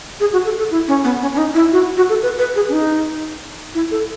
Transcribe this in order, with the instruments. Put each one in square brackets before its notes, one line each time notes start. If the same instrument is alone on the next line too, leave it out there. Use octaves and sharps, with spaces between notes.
[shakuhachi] G#4
F#4
A4
A4
E4
C#4
B3
C#4
C#4
D#4
E4
F#4
F#4
A4
B4
B4
G#4
C#4
D#4
E4
A4